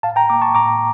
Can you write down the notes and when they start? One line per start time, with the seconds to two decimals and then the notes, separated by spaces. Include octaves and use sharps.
0.03 A2 F5 A5
0.16 G5 A#5
0.29 A#3 A#5 D6
0.42 A5 C#6
0.55 A2 A#5 D6